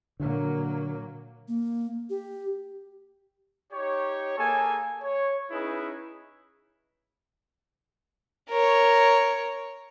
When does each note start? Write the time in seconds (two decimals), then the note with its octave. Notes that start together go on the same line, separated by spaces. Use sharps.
0.20 A#2 D3 F#3 A#3
1.48 A#3
2.10 G4
3.73 D#4 G4 C#5
4.38 A#3 G#4 A4 G#5
5.03 C#5
5.51 C#4 D#4 E4 G#4 B4
8.49 A#4 C#5